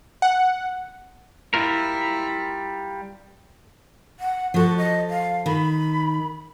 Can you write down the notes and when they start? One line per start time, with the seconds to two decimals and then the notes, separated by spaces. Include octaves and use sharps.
0.22 F#5
1.54 G3 E4 F4 A#4
4.20 F#5
4.54 F3 F#4 A4
4.77 D#5
5.10 F5
5.46 D#3 B5